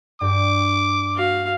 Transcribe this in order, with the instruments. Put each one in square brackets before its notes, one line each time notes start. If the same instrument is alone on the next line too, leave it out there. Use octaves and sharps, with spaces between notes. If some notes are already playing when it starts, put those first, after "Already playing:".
[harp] G2 G4 [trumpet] D6
[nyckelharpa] F#4 F5